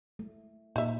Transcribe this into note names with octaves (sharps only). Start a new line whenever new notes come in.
A3
A#2 D#4 E5